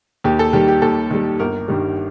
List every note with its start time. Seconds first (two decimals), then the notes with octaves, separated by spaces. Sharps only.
0.24 D#2 G4
0.39 A4
0.53 D#3 G3 G4
0.68 G4
0.82 D#2 A4
1.11 D#3 G3
1.40 G1 A#4
1.68 G2 D#3 G3